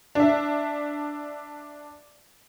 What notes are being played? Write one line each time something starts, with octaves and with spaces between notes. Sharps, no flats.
D4 E5